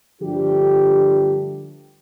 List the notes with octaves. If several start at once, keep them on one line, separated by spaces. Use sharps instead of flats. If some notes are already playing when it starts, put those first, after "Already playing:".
G2 D3 F3 G3 A3 G4